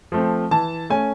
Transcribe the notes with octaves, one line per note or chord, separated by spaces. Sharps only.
F3 A3 C4
E3 A5
A3 C#4 G#5